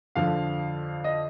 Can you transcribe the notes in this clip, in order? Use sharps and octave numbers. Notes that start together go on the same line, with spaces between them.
F2 D3 F3 F5
D#5